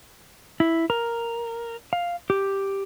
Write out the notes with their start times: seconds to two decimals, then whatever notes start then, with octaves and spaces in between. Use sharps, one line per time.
0.60 E4
0.90 A#4
1.93 F5
2.30 G4